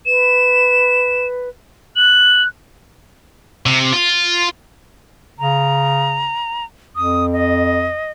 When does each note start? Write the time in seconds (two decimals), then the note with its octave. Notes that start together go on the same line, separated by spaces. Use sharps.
0.06 B4 E7
1.96 F#6 F#7
3.66 C3
3.93 F4
5.39 C#3 A#5
6.96 F2 D#6
7.33 D#5